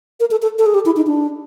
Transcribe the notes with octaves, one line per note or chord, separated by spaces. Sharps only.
A#4
A4
A4
A4
G#4
G4
E4
D#4
D4